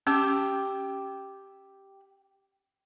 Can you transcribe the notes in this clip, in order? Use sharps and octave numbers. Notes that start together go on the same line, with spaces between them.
C#4 G4 G5 E6